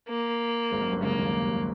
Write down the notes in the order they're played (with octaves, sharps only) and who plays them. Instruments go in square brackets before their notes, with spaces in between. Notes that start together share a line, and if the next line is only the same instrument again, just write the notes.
[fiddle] A#3
[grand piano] G#1 G#2
F#2
G1 G2
[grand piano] C#2 C#3 [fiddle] A#3
[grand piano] D#2 D#3